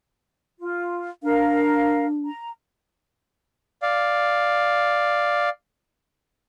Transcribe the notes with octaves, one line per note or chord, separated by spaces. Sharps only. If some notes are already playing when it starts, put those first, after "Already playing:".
F4
D4 A#4 F5
A#5
D5 F5